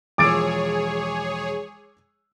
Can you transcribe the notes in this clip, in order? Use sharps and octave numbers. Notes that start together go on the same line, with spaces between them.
E1 F3 G#4 C#5 D6 E6 A6 D7